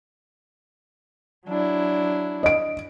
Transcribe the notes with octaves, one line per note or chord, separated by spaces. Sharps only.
F#3 D4 E4
D#5 D7